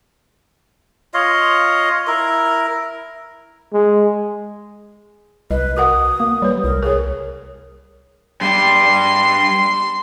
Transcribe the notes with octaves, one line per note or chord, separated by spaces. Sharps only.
F4 C#5 D#5 F5
E4 A#4
G#3
C2 B4 D#5
F#4 A#4 F#5 D#6
A#3
G3 B4 C#5
C2 A#4
G#4 A#4 C#5
G2 G3 C6